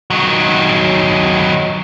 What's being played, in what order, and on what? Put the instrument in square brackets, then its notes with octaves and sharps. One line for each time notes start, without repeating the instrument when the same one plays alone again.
[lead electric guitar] D#3 F#3